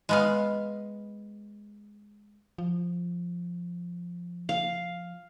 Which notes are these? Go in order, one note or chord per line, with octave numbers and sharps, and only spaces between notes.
G#3 B3 F5
F3
F5